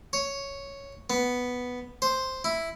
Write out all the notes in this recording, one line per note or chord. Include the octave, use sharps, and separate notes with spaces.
C#5
B3
C5
E4